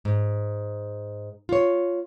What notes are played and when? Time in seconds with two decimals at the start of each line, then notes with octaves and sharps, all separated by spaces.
0.05 G#2
1.49 F4 C#5